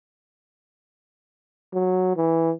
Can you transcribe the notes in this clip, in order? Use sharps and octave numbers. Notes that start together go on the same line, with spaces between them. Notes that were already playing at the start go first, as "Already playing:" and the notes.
F#3
E3